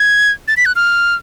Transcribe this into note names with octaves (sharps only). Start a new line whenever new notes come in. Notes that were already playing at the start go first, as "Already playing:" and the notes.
Already playing: G#6
A6
B6
F#6
F6